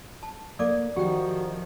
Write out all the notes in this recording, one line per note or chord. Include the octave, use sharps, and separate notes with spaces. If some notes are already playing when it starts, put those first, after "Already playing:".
A5
A#3 A4 D5 D6
D#3 F3 F#4 G4 G5